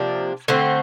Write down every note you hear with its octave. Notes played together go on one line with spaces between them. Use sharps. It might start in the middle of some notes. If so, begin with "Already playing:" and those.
Already playing: C3 F3 A#3 D4
D3 A3 C4